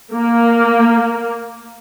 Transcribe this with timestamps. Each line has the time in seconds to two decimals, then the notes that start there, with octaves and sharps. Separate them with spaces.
0.13 A#3